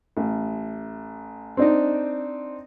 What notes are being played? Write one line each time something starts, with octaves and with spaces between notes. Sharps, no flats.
A1
C4 D4 D#4